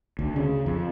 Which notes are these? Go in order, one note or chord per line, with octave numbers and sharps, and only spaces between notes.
D2
C#3
F2